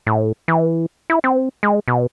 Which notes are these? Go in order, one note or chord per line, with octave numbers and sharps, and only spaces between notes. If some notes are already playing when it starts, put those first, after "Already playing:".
A2
E3
E4
C4
G#3
B2